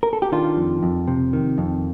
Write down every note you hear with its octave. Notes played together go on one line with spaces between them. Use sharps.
A#4
A4
G4
D#3 D4 F4
F2
F2
C3
D#3
F2